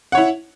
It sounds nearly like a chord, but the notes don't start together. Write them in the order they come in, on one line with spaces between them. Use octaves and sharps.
F#5 C#5 E4